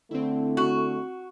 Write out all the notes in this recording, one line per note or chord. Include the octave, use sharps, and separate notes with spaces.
D3 A3 C4 E4
F#4